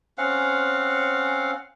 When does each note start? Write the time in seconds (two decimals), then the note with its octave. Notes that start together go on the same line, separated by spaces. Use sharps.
0.18 C4 C#4 F5 F#5